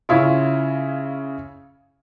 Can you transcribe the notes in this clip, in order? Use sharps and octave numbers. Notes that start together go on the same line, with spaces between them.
C#3 C#4 E4 F4